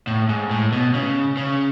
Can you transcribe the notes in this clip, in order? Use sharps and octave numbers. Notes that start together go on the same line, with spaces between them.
A2
G#2
A2
B2
C#3
C#3